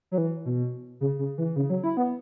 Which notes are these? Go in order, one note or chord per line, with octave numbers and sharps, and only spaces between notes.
F#3
E3
B2
C#3
C#3
E3
C#3
F#3
E4
B3